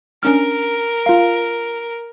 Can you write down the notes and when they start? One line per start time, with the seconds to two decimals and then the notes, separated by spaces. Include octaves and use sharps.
0.23 C#4 D4 A#4 F6
1.06 F4 F5